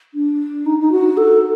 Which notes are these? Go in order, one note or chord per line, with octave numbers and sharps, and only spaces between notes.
D4
D#4
D#4
F#4
A4